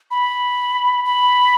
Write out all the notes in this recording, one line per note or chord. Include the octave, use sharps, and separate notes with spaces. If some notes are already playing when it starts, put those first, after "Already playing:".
B5
B5